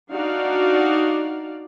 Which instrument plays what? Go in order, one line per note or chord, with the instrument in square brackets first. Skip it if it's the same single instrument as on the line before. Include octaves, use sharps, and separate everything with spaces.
[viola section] D4 D#4 F#4 D5 F5